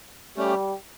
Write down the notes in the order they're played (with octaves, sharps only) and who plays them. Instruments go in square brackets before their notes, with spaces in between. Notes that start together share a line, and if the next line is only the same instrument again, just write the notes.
[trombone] G3 [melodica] A3 C#4 G4